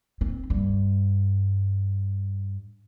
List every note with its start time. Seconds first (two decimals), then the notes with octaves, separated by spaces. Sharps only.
0.21 C4
0.50 G2